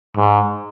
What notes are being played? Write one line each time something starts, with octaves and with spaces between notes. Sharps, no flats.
G#2